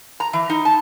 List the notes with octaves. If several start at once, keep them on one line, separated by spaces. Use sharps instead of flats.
A#5
E3
D#4
A5